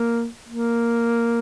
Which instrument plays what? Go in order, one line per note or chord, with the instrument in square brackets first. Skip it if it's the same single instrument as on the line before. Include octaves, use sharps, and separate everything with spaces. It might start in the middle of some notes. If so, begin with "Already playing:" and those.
Already playing: [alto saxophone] A#3
A#3